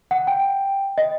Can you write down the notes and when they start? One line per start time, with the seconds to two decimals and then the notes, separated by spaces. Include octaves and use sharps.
0.11 F#5
0.27 G5
0.98 D#5